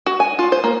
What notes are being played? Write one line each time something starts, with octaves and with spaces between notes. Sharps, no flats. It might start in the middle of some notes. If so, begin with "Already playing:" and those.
F#4
G#5
F4
C5
A#3